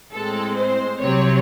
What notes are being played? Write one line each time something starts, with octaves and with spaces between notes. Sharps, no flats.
A2 G#3 C4 A4
C5
C2 C3 F#3 C4 C#5